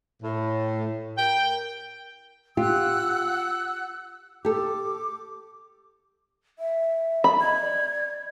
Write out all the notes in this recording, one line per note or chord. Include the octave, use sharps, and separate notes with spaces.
A2
A#4 G5
F4 G4 F#5 E6 F#6
G4 A4 D6
E5
B5
D#5 G#6
D5